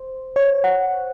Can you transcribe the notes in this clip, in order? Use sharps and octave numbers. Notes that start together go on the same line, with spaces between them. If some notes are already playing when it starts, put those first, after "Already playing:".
Already playing: C5
C#5
F#5